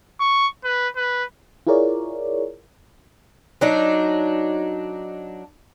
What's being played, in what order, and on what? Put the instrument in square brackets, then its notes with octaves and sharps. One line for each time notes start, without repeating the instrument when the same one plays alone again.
[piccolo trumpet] C#6
B4
B4
[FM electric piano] E4 F4 G#4 A#4 C#5 D5
[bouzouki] F#3 D4 D#4